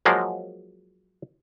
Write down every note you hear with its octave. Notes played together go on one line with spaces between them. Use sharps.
F3 F#3 G#3 A#3